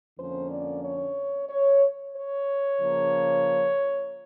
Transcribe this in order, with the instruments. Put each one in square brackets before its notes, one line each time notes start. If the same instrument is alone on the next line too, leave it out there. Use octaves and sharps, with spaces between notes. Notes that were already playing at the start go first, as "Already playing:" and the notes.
[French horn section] F2 D3 F3 A#3 C#4 C5
D5
C#5
C#5
C#5
C#3 F3 A#3